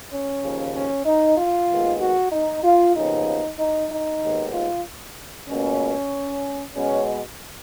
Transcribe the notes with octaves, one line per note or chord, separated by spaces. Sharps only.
C#4
D#2 C#3 F3
C#4
D#4
F4
D#2 D#3 G#3 B3
F#4
D#4
F4
D#2 C#3 F3 B3 D#4
D#4
D#4
D#2 D#3 G#3 B3
F4
C#2 B2 A#3 C#4
B2 G#3 B3 C#4